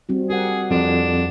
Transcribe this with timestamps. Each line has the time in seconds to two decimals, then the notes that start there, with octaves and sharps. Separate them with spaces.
0.09 G3 C4 F#4
0.30 G4 G#4 A#4 F#5
0.71 F2 D4